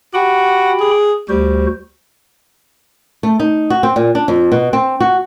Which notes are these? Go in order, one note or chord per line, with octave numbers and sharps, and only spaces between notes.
F#4 G4 G5 B5
G#4
D2 G3 F#4 C5
A3
D#4
F#4
C4
A#2
D4
F2
B2
C4
F#4